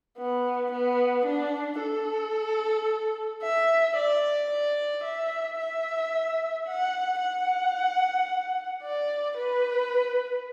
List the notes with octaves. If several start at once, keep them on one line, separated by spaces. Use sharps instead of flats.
B3
B3
D4
A4
E5
D5
D5
E5
E5
F#5
F#5
D5
B4